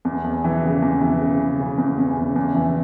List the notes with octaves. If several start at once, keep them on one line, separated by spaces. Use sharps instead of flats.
E2
E2
E3
C#3
E2
E3
C#3
C#3
C#3
E2
E2
C#3
E2
E3